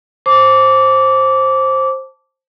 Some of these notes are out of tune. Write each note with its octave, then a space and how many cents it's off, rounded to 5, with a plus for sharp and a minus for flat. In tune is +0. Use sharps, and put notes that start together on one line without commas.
C5 +15 A5 +0 D6 -20